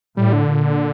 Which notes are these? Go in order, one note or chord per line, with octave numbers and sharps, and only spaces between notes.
A2 G3
D3
A#2